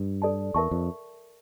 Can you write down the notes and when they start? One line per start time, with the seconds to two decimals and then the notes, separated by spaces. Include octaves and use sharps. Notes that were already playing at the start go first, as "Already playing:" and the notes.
Already playing: G2
0.22 A4 D5 A5
0.54 E2 A#4 E5 A5 C#6
0.71 F2